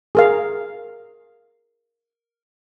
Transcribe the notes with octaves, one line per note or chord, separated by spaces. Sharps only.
G#4 A#4 F5